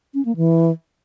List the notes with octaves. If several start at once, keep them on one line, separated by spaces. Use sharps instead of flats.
C#4
A#3
E3